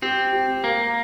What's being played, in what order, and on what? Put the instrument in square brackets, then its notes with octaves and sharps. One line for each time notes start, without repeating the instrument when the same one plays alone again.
[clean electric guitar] C4 [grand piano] G4
[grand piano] G4
[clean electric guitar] A#3 [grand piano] A#4